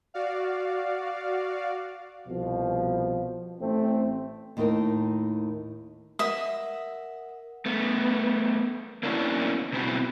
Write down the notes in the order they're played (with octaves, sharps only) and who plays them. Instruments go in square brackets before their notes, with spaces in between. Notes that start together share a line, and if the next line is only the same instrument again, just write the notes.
[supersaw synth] F#4 D5 F5
[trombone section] C2 B2 F3
A1 A3 C4
[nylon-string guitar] D#2 A2 D#4 E4 A#4 A5
[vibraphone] A#4 F#5 [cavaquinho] E5 D#6
[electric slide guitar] A3 B3
A#3 B3 C#4 D4 E4 F#4
B2 B3 C4 E4 F#4